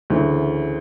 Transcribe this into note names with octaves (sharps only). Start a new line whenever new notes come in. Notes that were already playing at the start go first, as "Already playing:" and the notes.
D2 C#3 E3